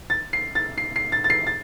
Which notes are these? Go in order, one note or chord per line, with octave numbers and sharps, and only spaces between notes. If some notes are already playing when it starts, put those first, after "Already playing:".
A6
C7
A6
C7
C7
A6
A6
C7
A6